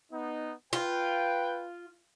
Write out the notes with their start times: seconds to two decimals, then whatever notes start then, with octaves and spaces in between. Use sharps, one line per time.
0.12 B3 D#4
0.73 F4 B4 G5